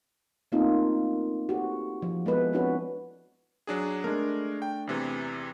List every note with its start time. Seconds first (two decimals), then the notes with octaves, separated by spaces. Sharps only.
0.52 A3 A#3 C4 C#4 D#4 F4
1.49 F#4 G4 A4 C5
2.02 F3
2.26 G#3 B3 E4 A4 B4 D#5
2.53 C4 D4 E4 F#4 B4 C#5
3.67 F#3 D4 G#4
4.04 G#3 A3 D4 A#4
4.62 G5
4.87 E2 C3 E3